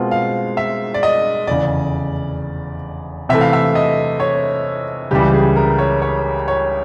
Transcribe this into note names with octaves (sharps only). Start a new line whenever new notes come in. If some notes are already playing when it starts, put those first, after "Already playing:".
Already playing: B2 G#3 C4 F4 A#4 F#5
F5
E5
D5
D#5
F1 E2 C#3 D5
C3 E3 A3 E5
F5
E5
D#5
C#5
C#2 C#3 E3 G3 G4
G#4
A#4
C#5
C#5
C#5